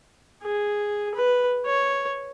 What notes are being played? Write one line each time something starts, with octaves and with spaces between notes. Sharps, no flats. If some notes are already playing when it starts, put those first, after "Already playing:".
G#4
B4
C#5